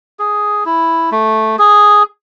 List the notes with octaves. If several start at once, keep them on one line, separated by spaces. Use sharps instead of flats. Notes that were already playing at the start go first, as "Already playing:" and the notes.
G#4
E4
A3
G#4